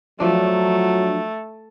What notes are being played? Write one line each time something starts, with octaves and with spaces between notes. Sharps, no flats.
F3 F#3 A3 D4